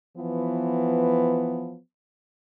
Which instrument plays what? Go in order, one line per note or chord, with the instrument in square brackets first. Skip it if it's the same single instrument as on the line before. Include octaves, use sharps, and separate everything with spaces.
[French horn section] E3 F3 B3